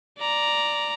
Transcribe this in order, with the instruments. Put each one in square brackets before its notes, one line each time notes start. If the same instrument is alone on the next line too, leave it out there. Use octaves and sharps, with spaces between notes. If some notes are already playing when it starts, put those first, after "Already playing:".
[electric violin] D5 A#5